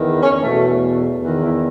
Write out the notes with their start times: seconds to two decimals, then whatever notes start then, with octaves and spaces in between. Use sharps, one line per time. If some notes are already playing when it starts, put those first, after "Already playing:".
Already playing: E2 D#3
0.22 C#4
0.42 E2 B2 A3
1.23 E2 D#3
1.44 E4